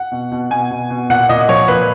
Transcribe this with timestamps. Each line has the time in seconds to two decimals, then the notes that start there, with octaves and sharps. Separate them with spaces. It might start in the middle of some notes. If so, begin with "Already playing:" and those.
Already playing: F#5
0.12 B2
0.32 B2
0.50 B2 G#5
0.71 B2
0.90 B2
1.10 A#2 F#5
1.29 A#2 D#5
1.49 F3 C#5
1.68 A#2 B4